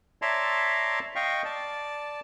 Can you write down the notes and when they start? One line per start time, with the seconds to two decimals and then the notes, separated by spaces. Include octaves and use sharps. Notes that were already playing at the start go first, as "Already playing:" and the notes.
0.22 C#5 D5 E5 A5 A#5 C6
1.16 D#5 F5 G5 C#6
1.45 D5 A5